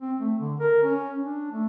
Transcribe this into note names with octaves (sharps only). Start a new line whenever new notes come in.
C4
A3
D3
A#4
C#4
D4
A3